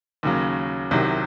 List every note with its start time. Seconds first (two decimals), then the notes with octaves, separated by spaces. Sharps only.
0.23 D#2 C#3 F#3
0.91 C2 C3 D#3 F#3